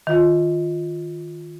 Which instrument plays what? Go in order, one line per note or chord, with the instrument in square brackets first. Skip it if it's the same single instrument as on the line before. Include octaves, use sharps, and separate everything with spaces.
[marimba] D#3 F4